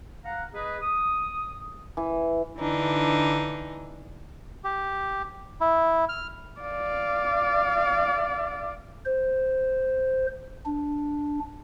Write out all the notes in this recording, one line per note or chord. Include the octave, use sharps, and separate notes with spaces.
F5 F#5 A#5
G#4 B4 D#5
D#6
E3
D3 E3 D4 D#4
G4
E4
F6
D5 F5
C5
D4